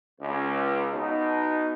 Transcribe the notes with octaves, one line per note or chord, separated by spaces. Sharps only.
C#2
B2 D#4